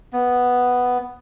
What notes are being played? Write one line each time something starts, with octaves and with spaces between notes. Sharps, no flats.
B3